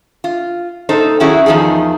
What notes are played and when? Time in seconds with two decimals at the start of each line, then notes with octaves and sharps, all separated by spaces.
0.24 F4
0.89 A#2 D#4 A4 C5
1.20 D#3 F#3 C#4 E4 F#4 G#4
1.46 E2 D#3 F3 D#4 G#4